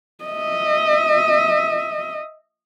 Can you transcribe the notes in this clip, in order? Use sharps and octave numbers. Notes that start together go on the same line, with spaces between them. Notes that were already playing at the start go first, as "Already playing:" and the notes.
D#5 E5